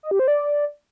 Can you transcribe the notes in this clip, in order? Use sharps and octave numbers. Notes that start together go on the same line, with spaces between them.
D#5
G4
C5
D5